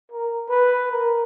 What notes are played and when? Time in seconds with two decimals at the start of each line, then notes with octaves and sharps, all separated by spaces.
0.12 A#4
0.49 B4
0.91 A#4